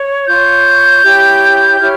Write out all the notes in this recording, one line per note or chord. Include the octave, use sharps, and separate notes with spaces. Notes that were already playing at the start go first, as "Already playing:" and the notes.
Already playing: C#5
F4 C#5 G6
E4 G4 C#5
E4 G4 C#5 F6